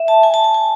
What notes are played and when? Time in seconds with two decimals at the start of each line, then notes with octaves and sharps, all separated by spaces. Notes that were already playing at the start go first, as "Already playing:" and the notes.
Already playing: E5
0.08 A5
0.23 G#5
0.34 A5
0.44 G#5
0.54 G#5